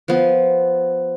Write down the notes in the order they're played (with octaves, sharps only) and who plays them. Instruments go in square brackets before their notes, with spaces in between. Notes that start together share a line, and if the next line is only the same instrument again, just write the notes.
[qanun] F3 B3